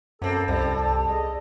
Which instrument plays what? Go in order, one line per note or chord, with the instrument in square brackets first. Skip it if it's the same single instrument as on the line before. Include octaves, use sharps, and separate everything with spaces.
[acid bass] F#2 [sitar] A#3 C4 [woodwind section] A4 [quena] A5
[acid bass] C2 [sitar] G3
[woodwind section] G#4 A4 D#5